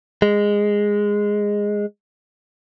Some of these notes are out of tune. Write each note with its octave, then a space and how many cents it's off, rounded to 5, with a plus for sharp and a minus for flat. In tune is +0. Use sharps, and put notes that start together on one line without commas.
G#3 -10